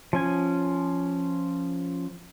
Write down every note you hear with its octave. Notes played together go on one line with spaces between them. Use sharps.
F3 C#4 G#5